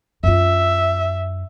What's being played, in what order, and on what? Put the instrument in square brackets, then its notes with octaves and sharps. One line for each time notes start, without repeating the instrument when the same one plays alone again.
[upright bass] F#2 F4 [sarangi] E5